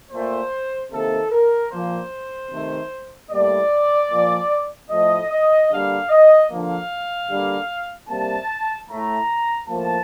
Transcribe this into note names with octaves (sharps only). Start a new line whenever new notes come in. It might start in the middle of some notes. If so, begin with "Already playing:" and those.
A#2 A3 C5
C3 D#3 A#3 A4
A#4
A#2 F3 A#3 C5
C3 D#3 A3
A2 G3 A#3 D5
A#2 F3 A#3
A2 F3 A3 D#5
D#5
D3 G3 A#3 F5
D#5
D3 F3 A#3 F5
D3 G3 A#3
C3 G3 A#3 A5
A2 A3 A#5
A2 F3 A#3 A5